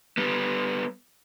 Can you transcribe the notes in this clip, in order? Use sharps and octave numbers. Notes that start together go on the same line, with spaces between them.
G3 B3